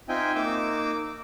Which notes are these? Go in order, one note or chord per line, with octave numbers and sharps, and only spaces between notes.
C4 D#4 F4 E5 G5 G#5
A#3 D#4 D6 E6